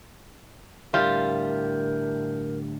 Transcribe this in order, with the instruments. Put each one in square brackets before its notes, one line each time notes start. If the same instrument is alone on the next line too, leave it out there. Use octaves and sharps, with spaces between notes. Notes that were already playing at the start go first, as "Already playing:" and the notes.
[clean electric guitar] A2 D3 E5 [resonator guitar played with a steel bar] G3 [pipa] F4 [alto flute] A#4